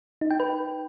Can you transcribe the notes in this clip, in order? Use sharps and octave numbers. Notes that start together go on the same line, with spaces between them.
D#4
G5
B4